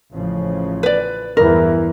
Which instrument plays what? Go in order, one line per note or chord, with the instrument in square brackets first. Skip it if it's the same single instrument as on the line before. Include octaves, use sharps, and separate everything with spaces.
[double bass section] A1 C#3 F3
[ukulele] B4 D5
[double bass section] E2 G2 E3 [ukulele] A#4